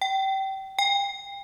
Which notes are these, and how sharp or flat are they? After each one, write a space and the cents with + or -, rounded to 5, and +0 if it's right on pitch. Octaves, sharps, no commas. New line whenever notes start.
G5 -25
G5 +35